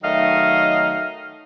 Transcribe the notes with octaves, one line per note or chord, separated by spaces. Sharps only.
D#3 F#3 A3 D#5 F5